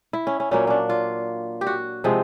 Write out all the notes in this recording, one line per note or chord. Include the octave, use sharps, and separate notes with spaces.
E4
C#4
C#4
A#2 F#3 A#3 C#4
C#4 D4
F4
G4
F#4
C3 F3 G#3 C4